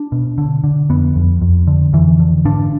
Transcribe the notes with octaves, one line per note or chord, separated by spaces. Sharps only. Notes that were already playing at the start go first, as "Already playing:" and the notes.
Already playing: D4
B2
D3
D3
F2 B3
F2
F2
D3
F2 E3
D3
G#2 D4